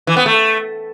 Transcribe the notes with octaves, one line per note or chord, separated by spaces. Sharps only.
E3
B3
A3